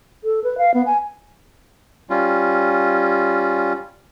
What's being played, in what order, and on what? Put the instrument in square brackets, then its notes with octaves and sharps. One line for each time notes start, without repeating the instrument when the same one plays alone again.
[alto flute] A4
B4
F5
B3
G#5
[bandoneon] G3 C#4 F4